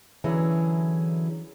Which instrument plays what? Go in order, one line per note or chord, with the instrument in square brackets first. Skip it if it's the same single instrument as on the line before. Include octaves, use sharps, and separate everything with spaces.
[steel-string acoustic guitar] D3 E3 F#3 C#4 E4 G#4